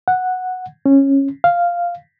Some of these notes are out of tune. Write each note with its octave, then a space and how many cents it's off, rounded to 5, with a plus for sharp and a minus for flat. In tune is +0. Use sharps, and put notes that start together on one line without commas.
F#5 -5
C#4 -15
F5 -5